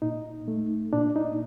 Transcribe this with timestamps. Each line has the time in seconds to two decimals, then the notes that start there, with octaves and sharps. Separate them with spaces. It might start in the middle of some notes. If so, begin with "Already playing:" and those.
0.02 A#2 D#4
0.48 A3
0.93 A#2 D4
1.16 D#4